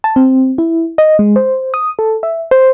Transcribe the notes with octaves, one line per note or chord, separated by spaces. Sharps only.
A5
C4
E4
D#5
G#3
C5
D#6
A4
E5
C5